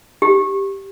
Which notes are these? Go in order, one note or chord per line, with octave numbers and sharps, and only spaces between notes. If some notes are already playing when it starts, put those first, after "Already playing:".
G4